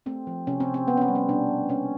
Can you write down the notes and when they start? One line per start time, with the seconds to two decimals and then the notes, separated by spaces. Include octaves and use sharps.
0.06 A3 C4
0.27 F3
0.47 C3 C#4
0.60 C4
0.68 C3
0.74 C4
0.88 A#3 B3
0.97 C#4
1.01 C4
1.08 G3
1.15 C#4
1.29 B2 D4
1.49 B2
1.69 A#3 C#4